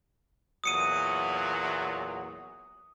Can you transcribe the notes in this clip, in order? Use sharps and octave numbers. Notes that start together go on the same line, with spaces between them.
E2 A#2 F#3 D#6 C#7 D#7